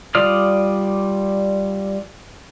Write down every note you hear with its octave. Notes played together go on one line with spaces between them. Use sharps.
G3 F4 D5 D#6 F6